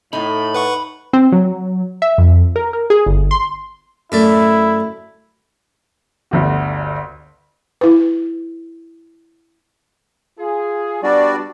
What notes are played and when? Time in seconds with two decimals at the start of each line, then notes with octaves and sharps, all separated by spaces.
0.13 A2 D#4 B5
0.54 B4 F#5 C#6
1.13 C4
1.32 F#3
2.02 E5
2.18 F2
2.56 A#4
2.73 A#4
2.90 G#4
3.06 G1
3.31 C6
4.12 F#2 A3 E4 D5
6.31 G1 D2 F#4
7.81 E4 B4
10.39 F4 G#4
11.03 G3 B3 D4 F#4 D5